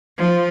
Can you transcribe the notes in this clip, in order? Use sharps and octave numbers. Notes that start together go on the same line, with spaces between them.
F3